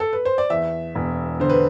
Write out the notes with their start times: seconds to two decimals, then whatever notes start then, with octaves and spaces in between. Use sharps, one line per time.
0.00 A4
0.13 B4
0.25 C5
0.38 D5
0.50 E2 E5
0.95 E1
1.40 D3 C5
1.50 B4